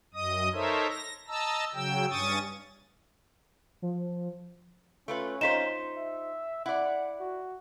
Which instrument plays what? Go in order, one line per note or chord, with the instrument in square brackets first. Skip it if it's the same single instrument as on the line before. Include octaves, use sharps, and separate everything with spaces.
[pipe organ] F#2 D#5 D#6
D#4 A4 A#4 C5 C#5 E5
A#6
D#5 A5 A#5 E6
C#3 F#3 G5 E6
G2 C#4 C#6 D#6 A6
[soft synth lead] F3
[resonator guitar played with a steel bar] A3 F4 B4 [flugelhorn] C#4
[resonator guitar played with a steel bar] D#4 F4 C5 [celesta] B6 E7
[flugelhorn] E5
[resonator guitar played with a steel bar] E4 D5 [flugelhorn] F#5
[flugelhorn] F#4